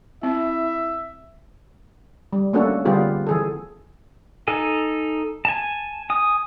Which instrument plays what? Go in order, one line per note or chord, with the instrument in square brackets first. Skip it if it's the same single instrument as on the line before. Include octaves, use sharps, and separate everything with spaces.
[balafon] C4 [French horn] E4 [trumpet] E5
[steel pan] G3
A3 A#3 C#4 D4 F#4 A4
D3 G3 B3 F4 G4 G#4
E3 G#4 A4
[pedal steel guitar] D#4 A4 G#5
G#5 A5
G#5 D#6